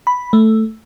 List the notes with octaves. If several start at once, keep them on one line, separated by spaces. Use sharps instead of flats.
B5
A3